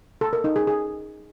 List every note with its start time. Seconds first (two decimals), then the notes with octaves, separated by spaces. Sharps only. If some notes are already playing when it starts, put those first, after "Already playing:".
0.21 A4
0.33 A#4
0.44 D#4
0.56 G#4
0.67 G#4